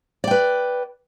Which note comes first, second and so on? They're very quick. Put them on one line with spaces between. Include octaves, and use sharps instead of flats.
D5 G5 B4